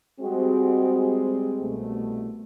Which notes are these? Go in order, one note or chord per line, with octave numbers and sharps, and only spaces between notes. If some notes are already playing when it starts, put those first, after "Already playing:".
G3 G#3 C4 F#4
C2 B2 A3